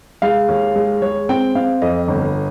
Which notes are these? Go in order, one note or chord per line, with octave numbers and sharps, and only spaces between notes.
G#3 F5
D#2
G#3
G#3 C#5
C4 G5
C4 F5
F2 D#5
G1